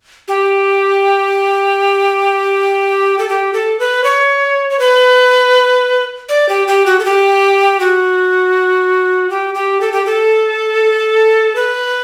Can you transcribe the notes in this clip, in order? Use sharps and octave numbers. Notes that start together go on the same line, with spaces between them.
G4
A4
G4
A4
B4
C#5
C#5
B4
D5
G4
G4
F#4
A4
G4
F#4
G4
G4
A4
G4
A4
B4